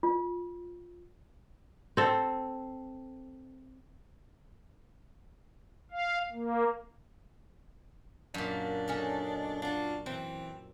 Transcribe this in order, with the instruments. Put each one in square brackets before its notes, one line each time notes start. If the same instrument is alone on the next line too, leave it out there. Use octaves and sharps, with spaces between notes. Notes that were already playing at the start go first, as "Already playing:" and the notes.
[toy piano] F4
[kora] C4 A4
[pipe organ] F5
A#3
[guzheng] F#2 A#2 [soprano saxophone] D4
[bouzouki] C#4 D#4 A4
[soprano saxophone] D4 [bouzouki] F4 F#4
[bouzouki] E3 [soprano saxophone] C4